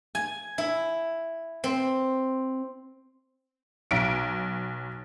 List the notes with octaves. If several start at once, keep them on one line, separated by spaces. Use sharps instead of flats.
G#5
E4
C4
B1 D7